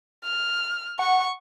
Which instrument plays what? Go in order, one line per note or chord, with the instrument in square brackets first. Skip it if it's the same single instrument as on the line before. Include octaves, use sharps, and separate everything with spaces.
[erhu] F6
[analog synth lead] F#5 [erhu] C#6